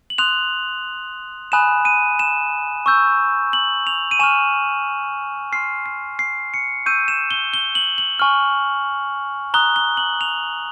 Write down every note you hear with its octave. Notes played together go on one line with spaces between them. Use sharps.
F#7
C6 D#6 F#6 F7
G#5 B5 D#6 F#6 E7
D#7
E7
C#6 E6 G6
F#7
F7
D#7
G#5 C#6 F6 E7
C6 F6 C7
C7
C7
C#7
C#6 E6 G6 D#7
E7
G7
G7
F#7
F#7
G#5 C#6 F6
A#5 D#6 F#6 G7
G7
F#7
F7